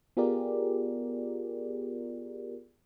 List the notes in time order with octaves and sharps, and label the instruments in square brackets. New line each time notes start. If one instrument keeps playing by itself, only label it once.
[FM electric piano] B3 F4 G4 G#4 A#4 D5